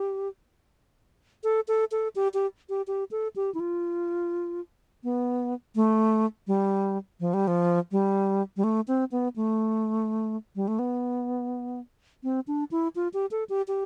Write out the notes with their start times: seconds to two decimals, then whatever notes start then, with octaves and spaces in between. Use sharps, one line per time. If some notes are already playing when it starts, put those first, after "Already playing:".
Already playing: G4
1.44 A4
1.68 A4
1.91 A4
2.16 G4
2.34 G4
2.69 G4
2.87 G4
3.11 A4
3.36 G4
3.54 E4
3.60 F4
5.04 B3
5.75 A3
6.47 G3
7.20 F3
7.34 G3
7.47 F3
7.92 G3
8.57 G3
8.64 A3
8.88 C4
9.12 B3
9.36 A3
10.56 G3
10.68 A3
10.79 B3
12.23 C4
12.47 D4
12.71 E4
12.96 F4
13.14 G4
13.31 A4
13.49 G4
13.68 G4